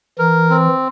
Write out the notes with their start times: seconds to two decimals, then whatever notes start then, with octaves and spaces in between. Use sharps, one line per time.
0.19 E3 A#4
0.50 C4